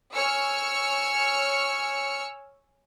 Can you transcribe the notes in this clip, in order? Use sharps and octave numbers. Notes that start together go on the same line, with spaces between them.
C#5 G#5 C#6 E6 F6 C#7